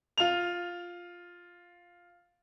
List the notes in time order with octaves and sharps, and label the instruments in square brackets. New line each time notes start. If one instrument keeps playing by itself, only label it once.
[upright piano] F4 F7